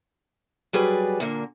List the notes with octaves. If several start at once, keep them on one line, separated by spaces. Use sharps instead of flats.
F#3 G3 G#4 B4 D5
A#2 D3 A#3